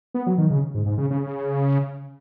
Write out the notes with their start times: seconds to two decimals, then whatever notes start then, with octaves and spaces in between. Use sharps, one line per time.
0.14 B3
0.27 F#3
0.38 D#3
0.50 C#3
0.75 G#2
0.86 G#2
0.98 C#3
1.10 C#3